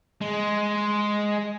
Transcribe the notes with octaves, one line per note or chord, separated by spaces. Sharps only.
G#3